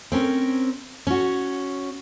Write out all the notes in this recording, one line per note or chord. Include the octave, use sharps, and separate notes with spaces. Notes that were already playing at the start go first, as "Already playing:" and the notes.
C4 C#4 A#4
C#4 F#4